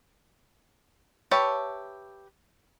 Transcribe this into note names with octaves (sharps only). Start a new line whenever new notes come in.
G4 B4 C#5 E5 A5